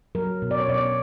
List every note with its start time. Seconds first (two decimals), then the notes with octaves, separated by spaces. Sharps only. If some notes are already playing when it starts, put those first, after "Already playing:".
0.15 F#3 A#4
0.42 B2
0.51 D5
0.60 C#5
0.68 B2 D5